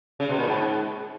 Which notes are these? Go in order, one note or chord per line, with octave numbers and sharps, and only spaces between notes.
C#3
B2
A#2
G#2